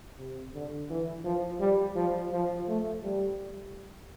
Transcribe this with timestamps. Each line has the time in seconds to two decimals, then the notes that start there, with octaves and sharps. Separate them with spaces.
0.18 C3
0.54 D3
0.90 E3
1.25 F3
1.60 G3
1.95 F3
2.32 F3
2.68 A3
3.03 G3